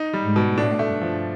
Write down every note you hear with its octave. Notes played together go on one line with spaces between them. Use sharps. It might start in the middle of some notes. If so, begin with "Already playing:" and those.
Already playing: D#4
G3
G#2
B2
A2 D4
A3
G2
F3